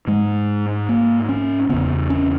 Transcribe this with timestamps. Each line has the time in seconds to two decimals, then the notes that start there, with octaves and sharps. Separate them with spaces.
0.07 G#2 G#3
0.89 A#3
1.29 C#4
1.69 E2 C#3 B3
2.10 C#4